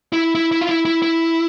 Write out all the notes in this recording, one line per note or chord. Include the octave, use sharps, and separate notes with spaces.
E4
E4
E4
F4
E4
E4
E4